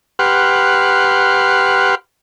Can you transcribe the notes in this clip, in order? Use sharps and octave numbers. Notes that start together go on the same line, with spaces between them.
G4 B4 F#5 C6 F6